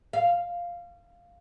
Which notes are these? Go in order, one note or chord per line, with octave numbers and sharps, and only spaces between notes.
F5